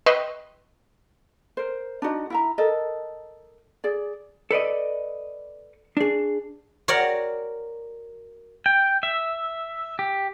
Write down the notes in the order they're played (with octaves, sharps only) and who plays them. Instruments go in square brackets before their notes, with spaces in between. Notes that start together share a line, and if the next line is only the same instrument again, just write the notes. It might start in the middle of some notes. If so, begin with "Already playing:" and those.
[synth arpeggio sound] B4 D#5 E5 G5 C6 C#6
[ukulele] A#4 C5
D4 D#4 F#4 D#5
E4 E5 A#5
A4 A#4 D#5
G#4 D5
[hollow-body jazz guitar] A4 B4 D5 D#5
D4 G#4
[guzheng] F#4 A#4 C#5 D5 F#5 G5
[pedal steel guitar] G5
E5
G4